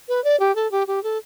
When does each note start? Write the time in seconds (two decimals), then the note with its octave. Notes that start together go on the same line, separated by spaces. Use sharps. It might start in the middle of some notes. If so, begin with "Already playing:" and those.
0.09 B4
0.24 D5
0.40 G4
0.55 A4
0.71 G4
0.87 G4
1.03 A4